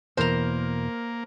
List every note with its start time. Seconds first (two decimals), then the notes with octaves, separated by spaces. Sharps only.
0.17 E2 B2 E3 A#3 A#4 C5 A#5